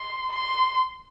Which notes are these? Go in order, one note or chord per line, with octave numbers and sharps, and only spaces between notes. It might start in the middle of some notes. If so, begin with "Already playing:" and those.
Already playing: C6
C6